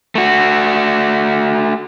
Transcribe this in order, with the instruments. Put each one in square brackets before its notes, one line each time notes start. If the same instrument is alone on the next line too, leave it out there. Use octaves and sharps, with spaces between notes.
[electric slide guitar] A3 F#4